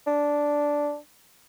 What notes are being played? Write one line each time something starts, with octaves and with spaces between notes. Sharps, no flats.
D4